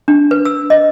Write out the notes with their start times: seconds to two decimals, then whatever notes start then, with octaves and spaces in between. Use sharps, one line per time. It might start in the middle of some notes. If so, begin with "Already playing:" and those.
0.08 D4
0.31 B4
0.45 E6
0.70 D#5